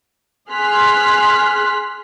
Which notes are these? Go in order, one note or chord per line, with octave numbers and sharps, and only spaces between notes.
G#4 C6 F6 F#6 B6